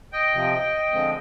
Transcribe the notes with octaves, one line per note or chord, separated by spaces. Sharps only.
D#5 G5
C3 F3 C4
D3 F3 G#3 C4